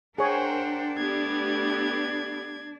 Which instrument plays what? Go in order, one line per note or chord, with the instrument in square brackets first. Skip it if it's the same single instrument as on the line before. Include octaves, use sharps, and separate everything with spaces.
[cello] D4 [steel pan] G#4 C#5 [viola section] A#4 C5 [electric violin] F#5 G5
[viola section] A3 B3 G4 [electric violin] D5 G#6